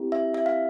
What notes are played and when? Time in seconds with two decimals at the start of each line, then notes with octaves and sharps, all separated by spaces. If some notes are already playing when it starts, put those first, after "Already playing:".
Already playing: C4 E4 G4
0.12 E5
0.34 E5
0.46 F5